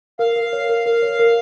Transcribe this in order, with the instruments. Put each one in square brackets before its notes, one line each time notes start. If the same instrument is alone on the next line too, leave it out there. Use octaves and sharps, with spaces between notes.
[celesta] A#4 [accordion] F5
[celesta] A#4
C#5
A#4
A#4
C#5
A#4